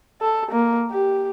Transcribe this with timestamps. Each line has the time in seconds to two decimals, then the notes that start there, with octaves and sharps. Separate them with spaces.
0.22 A4
0.51 A#3
0.91 G4